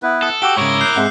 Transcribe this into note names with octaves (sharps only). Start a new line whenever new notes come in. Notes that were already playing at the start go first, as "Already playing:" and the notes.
B3 E4 B4
A4 D#6
F#4 G4 F#5 G5 D6 E6 G7
G#2 C#3 E4 A#4 C#5 C#6
F#6 G6 C7
G#2 G#3 C4 E5 F#5